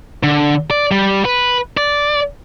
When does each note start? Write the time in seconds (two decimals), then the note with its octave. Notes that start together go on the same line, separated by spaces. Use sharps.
0.23 D3
0.71 D5
0.92 G3
1.25 B4
1.77 D5